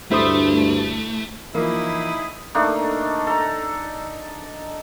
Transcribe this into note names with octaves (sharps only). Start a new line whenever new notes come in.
D2 G2 A3 E4 C5 D#6
E3 F3 A#3 D#4 E4 G#4 B5 D#6
A3 A#3 D4 D#4
A4 A#5